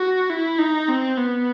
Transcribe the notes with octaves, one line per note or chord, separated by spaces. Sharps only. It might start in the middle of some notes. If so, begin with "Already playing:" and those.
Already playing: F#4
E4
D#4
C4
B3